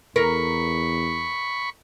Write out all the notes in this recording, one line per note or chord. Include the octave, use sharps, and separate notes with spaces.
E2 A#4 B5 C#6